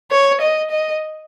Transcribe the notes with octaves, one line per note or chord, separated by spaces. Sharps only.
C#5
D#5
D#5